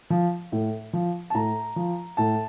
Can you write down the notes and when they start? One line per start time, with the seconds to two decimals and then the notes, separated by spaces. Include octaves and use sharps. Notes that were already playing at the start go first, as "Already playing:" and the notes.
0.10 F3
0.52 A2
0.93 F3
1.30 A5
1.34 A2 A#5
1.76 F3
2.17 A2 A5